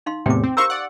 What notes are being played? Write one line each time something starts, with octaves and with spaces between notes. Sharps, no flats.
D#4 F5 C6
E2 A2 C3 G5 D6
C4
G4 A#4 C5 F5 C#6 E6
D5 F#5